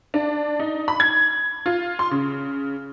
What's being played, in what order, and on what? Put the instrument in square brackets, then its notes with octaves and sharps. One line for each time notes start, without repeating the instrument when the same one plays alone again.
[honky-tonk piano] D4
D#4
B5
G#6
F4
C6
C#3